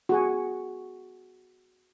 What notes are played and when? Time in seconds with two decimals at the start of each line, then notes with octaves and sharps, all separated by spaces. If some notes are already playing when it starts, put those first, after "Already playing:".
0.09 F#4 G#4 G#5